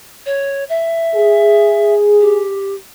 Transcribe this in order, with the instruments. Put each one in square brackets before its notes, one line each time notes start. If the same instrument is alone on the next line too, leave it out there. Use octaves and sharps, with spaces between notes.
[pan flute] C#5
E5
[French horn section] G#4
[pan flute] G4